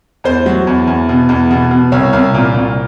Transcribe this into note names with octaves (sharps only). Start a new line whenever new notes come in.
E2 C5
F#3
E2
E2
B2
E2
B2
B2
C2 C#5
C2
A#2
C2